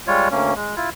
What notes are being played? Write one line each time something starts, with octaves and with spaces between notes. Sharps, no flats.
G3 G#3 F4 C#5
D2 A#3 C#4
G#3
E4 F4